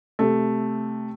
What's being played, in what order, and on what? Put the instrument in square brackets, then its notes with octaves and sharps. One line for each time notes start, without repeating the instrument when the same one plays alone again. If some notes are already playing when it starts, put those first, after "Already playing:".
[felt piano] C3 A3